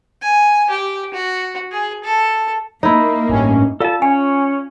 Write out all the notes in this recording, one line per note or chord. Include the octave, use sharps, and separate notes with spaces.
G#5
G4
F#4
G#4
A4
A#3 D#4 E4
A1 G2 C#4
F4 A4 D5 F5 A5
C#4 C#5 G#5